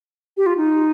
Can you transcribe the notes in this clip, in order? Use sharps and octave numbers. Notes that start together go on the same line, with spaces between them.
G4
F4
D#4